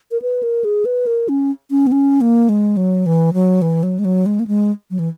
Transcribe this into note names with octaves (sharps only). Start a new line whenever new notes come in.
A#4
B4
A#4
G#4
B4
A#4
C#4
C#4
B3
C#4
A#3
G#3
F#3
E3
F#3
E3
F#3
G#3
F#3
G#3
A#3
G#3
F#3
E3